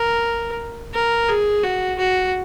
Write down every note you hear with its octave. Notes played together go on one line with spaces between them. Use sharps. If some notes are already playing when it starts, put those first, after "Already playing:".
Already playing: A#4
A#4
G#4
F#4
F#4